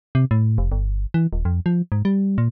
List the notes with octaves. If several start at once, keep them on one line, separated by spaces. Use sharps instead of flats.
C3
A2
F1
G1
E3
D#1
F2
F3
G#2
G3
A#2